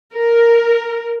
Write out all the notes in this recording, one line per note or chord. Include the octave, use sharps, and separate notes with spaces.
A#4